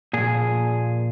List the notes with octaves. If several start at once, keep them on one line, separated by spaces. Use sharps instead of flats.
A#2 F3 G#4